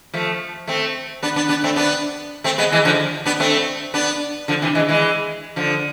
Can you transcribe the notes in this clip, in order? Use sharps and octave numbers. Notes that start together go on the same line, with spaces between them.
F3 A3
A3 C4
B3 D4
B3 D4
B3 D4
A3 C4
B3 D4
A3 C4
G#3 B3
E3 G#3
D3 F3
B3 D4
A3 C4
B3 D4
D3 F3
C3 E3
E3 G#3
E3 G#3
D3 F3